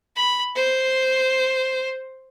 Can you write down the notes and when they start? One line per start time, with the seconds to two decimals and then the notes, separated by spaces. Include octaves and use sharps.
0.16 B5
0.55 C5